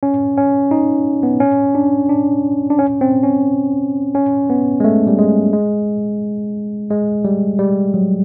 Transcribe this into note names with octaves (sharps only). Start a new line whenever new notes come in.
C#4
C#4
D#4
B3
C#4
D4
D4
D4
C#4
C4
C#4
C#4
B3
G#3
A3
G3
G#3
G#3
G#3
G3
G3
F#3